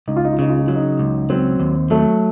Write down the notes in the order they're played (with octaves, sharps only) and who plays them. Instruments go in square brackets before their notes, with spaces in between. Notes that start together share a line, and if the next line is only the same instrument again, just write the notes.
[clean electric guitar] C#2 [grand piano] D#4
[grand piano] F4
D#4
F4
[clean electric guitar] C#3 [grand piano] D#4
[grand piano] F4
D#4
[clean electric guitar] F#3 [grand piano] F4
[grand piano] D#4
[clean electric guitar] C#2
[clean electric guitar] F#3 [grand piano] C4
[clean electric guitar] D#2
[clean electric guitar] F#3 [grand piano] A3